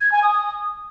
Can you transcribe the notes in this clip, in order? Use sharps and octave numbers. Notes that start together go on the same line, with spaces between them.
G#6
G#5
D#6